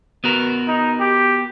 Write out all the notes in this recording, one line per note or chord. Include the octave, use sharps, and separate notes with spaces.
B3 F#4 A#4
D#4
G4